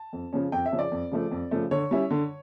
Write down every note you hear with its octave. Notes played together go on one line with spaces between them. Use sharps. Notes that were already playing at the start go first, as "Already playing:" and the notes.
Already playing: A5
F2
C#3 F3 C#4
F2 G5
E5
C#3 F3 C#4
D5
F2
C#3 F3 A3
F2
C#3 F3 A3
D3 C#5
G3 C#4 E4
D3